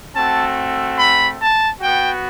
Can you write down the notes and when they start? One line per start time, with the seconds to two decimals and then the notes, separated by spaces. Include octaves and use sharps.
0.15 A3 C4 F#4 A5
0.98 B5
1.39 A5
1.81 B3 F#4 G5